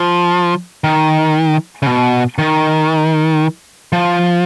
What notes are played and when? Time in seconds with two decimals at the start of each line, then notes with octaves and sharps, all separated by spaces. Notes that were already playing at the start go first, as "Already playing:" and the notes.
Already playing: F3
0.84 D#3
1.83 C#3
1.87 B2
2.38 D#3
3.92 F3